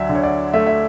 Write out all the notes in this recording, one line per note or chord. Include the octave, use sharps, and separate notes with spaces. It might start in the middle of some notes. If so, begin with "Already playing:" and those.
Already playing: D2 F#3 D5 E5
D3
C#5
D5
A3 E5
E5